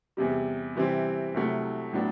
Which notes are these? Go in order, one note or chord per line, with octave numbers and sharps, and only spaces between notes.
E2 C3 G3
C3 E3 G3 C4
C2 C3 F#3 A3 E4
A2 F#3 B3 D4